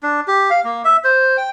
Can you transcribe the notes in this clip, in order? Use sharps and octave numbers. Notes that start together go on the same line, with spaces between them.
D4
G4
F5
A#3
E5
C5
G5